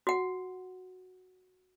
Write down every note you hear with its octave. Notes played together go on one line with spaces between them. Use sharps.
F#4 F#5